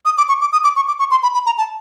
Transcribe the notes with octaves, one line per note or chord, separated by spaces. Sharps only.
D#6
D6
C#6
D6
D#6
D6
C#6
D6
C#6
C6
B5
B5
A#5
A5